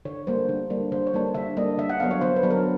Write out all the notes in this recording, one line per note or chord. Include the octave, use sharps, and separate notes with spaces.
D3 C#5
G3 A#3 D4 C5
D3
G3 A#3 D4
D3 C5
C#5
G3 A#3 D4
D3 E5
G3 A#3 D4 D#5
D3 E5
F#5
F#3 B3 D4 F5
C#5
D3 C5
B4
F#3 B3 D4
A#4